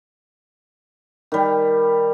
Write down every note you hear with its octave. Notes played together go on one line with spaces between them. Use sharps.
D#3 G3